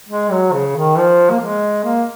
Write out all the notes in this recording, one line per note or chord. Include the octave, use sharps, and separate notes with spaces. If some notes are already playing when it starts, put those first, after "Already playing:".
G#3
F#3
C#3
D#3
F3
A#3
G#3
A#3